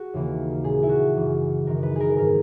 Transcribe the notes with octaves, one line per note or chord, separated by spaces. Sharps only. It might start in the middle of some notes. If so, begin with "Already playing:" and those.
Already playing: F#4 G#4
D#2 C#3 E3 A#3
A#2 G#3 G#4
E4
F#4
F#2 C#3 E3
F#2 D#3 G#3 A#4
B4
G#4 A#4
G#2 D#3 A#3 A#4